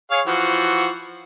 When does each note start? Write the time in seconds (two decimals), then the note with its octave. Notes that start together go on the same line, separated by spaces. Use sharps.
0.11 G#4 C#5 F5
0.27 E3 F3 F#4